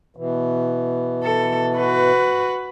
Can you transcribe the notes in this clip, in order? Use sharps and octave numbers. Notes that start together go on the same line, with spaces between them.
B2 E3
A4
F#4 B4